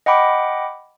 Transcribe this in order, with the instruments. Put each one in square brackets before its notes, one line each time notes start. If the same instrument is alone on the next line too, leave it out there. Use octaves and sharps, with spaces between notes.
[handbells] D#5 F#5 G5 B5 D6